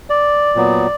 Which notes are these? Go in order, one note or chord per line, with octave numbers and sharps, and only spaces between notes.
D5
A#2 F#3 B3